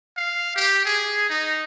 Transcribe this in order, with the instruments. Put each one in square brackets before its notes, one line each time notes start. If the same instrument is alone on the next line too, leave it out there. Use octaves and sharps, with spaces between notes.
[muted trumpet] F5
G4
G#4
D#4